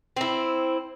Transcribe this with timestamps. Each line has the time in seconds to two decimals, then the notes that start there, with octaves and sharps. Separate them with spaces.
0.17 C4 E4